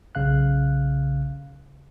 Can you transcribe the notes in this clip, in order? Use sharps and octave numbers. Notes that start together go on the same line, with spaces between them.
B1 C#3 F5 F#6